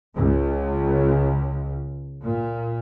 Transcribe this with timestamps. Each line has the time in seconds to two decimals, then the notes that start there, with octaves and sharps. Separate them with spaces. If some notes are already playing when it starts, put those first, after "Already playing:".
0.16 C#2
2.22 A#2